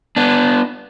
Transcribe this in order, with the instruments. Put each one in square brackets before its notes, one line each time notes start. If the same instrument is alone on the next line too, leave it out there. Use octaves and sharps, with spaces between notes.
[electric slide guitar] B3 D4